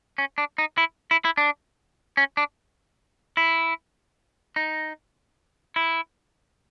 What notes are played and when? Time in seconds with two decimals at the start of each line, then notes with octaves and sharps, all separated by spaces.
0.18 C#4
0.38 D4
0.58 D#4
0.78 E4
1.11 E4
1.25 E4
1.37 D4
2.17 C#4
2.37 D4
3.37 E4
4.56 D#4
5.76 E4